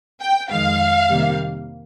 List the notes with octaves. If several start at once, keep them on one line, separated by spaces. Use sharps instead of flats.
G5
F2 D#3 G#3 F5
C3 D#3 G3 A#3